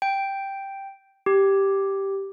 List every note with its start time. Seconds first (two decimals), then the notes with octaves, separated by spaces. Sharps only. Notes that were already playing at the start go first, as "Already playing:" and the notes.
0.02 G5
1.26 G4